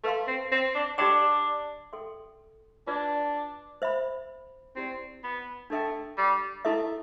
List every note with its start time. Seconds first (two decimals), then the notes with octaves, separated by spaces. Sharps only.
0.04 A3 B4 F5 C6
0.27 C4
0.52 C4
0.75 D4
0.98 D4 G4 D5 G5
1.93 A4 E5 G5 C6
2.87 D4 F4 B4 D5
3.82 C5 E5 B5
4.76 C4 E4 G4 D5
5.24 B3
5.70 A3 D4 A4 E5 G5
6.18 G3
6.65 A3 E4 A4 E5